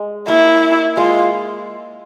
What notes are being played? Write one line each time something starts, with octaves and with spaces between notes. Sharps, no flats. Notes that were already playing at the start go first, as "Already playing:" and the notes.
Already playing: G#3
A#3 E4
G#3 F4